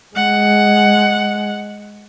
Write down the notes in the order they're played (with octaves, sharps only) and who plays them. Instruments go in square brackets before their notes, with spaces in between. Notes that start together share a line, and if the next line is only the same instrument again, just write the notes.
[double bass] G#3 [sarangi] F#5